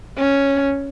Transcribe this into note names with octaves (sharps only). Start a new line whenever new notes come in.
C#4